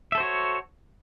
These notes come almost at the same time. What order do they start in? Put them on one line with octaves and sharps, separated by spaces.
E5 A4 C5 F#4 C#5